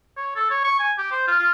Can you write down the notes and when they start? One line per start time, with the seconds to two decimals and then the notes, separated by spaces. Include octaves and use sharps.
0.17 C#5
0.36 A4
0.50 C#5
0.64 C#6
0.80 G#5
0.98 G4
1.12 C5
1.27 F4
1.40 F4